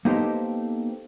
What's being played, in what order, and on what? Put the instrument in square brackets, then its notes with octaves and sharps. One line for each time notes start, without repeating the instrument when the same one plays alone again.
[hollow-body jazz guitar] A#3 B3 D#4 G4 A4 C5